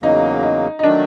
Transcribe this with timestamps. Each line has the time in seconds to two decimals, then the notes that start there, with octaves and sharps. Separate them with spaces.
0.02 E2 C#3 F#3 A#3 D#4
0.43 D#4
0.79 D#4
0.83 D#3 F#3 A3 D4